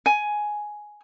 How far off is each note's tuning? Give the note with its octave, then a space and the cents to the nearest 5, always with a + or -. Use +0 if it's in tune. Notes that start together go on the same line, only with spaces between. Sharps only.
G#5 +10